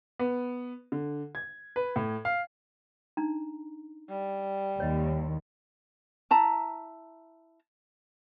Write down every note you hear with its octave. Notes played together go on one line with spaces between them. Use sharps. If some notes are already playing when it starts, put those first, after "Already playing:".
B3
D3
G#6
B4
A2
F5
D4 D#4 A#5
G3
D#2 C#5 D#5
E4 A5 A#5